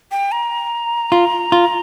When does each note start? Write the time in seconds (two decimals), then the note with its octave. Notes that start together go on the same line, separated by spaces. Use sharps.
0.11 G5
0.32 A#5
1.12 F4
1.52 F4